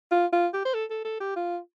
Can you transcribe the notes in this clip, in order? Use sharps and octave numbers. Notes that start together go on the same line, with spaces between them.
F4
F4
G4
C5
A4
A4
A4
G4
F4